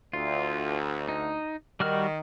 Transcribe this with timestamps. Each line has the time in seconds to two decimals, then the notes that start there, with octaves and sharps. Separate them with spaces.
0.13 D2 F4
1.08 D#4
1.80 D#3 G3 F#4 F6